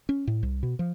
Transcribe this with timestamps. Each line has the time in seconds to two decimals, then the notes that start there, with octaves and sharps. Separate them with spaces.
0.09 C#4
0.27 A2
0.43 C2
0.63 B2
0.79 F3